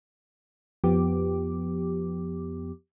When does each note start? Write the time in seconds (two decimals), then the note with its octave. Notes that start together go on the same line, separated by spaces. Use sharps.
0.84 F2 F3 B3 G4 D6